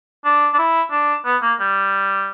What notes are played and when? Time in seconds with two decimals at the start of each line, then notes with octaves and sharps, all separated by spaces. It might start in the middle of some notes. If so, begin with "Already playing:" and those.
0.25 D4
0.54 D4
0.59 E4
0.91 D4
1.25 B3
1.42 A#3
1.60 G3